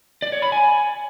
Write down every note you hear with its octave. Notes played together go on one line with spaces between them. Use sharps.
D5
C#5
B5
G#5